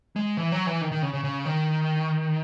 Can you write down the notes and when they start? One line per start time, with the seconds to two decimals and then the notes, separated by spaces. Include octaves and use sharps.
0.16 G#3
0.37 E3
0.52 F#3
0.67 E3
0.81 D#3
0.92 D#3
1.03 C#3
1.13 C#3
1.24 C#3
1.45 D#3